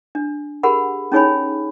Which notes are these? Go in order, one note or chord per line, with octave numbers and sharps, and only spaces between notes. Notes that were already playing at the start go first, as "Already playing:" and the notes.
D4
G4 G#4 A#4 F#5 B5
C#4 D#4 G#4 C#5 G#5 B5